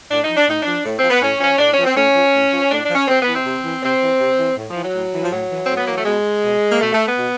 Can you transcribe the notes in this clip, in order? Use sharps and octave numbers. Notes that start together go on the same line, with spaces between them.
A2 D4
F3 D#4
D4
A2 D#4
F3 D4
A2
C4
F3
B3
A2 C#4
F3 C#4
A2 D4
C#4
F3
C4
A2 C#4
F3
A2
F3
A2 D4
D4
F3
C#4
C3 C4
B3
E3
C4
C3
E3
C3 C4
E3
C3
E3
A2
F3
E3
F#3
A2
E3
F3
A2 F#3
E3
A2 C4
B3
E3 A#3
A3
B2 G#3
B2
A#3
B2 A3
A3
B3
B2